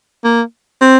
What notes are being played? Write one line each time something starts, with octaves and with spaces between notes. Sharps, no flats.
A#3
C4